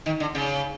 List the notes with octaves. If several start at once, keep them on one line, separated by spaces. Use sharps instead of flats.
D#3
D3
C#3